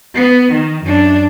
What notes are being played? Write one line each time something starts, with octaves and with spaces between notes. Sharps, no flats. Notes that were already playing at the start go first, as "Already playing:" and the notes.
B3
D#3
F#2 D4